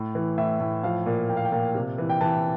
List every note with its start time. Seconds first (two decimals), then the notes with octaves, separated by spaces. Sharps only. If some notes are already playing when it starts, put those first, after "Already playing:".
Already playing: A2
0.15 E3
0.38 A2 E5
0.60 A2
0.83 F3 F5
1.06 A#2
1.29 A#3 G5
1.37 F5
1.45 G5
1.52 A#2
1.75 C3
1.98 E3
2.10 G5
2.21 E3 A5